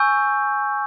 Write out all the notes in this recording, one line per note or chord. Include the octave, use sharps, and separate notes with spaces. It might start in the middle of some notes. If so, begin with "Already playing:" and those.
Already playing: G#5 C#6 E6 G6